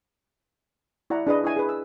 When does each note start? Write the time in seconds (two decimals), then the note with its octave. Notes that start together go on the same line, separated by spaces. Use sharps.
1.10 E4 D5 F#5 A#5
1.27 D4 G#4 B4 D#5
1.44 E4 D#5 G#5
1.56 G#4 B4
1.69 E6